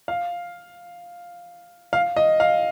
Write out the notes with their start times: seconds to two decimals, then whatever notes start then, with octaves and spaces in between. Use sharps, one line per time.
0.08 F5
1.93 F5
2.16 D#5
2.40 F5